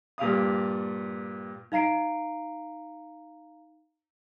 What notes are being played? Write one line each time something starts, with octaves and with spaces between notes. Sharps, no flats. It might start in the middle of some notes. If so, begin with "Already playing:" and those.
G2 A#2 G4 F5 D#6
D#4 F5 A#5 C7 D7